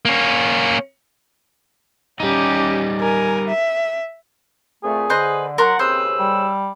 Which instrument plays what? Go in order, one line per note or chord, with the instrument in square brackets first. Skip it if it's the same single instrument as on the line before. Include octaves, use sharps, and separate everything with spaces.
[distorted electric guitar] A#3 C#4
[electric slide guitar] G3 D#4 [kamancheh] C#4 G4
[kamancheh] A#4 G#5
E5
[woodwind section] F2 A#2 A3 [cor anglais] G#4
[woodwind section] D3 [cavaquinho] B4 C5 D#5
[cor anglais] F#3 [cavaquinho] A#4 C6 C#6 [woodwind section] F#5
[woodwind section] D#2 C#3 E6 [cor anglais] C4 [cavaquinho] B4 C5 D#6
[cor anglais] G3